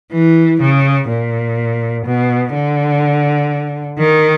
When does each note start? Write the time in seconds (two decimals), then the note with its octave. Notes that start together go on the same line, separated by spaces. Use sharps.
0.13 E3
0.61 C#3
1.09 A#2
2.05 B2
2.54 D3
3.99 D#3